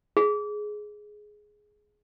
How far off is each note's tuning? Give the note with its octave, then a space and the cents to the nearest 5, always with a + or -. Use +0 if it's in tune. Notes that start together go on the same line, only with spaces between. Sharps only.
G#4 +10